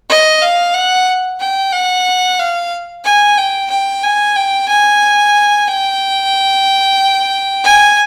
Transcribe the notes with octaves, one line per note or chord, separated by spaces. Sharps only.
D#5
F5
F#5
G5
F#5
F5
G#5
G5
G5
G#5
G5
G#5
G5
G#5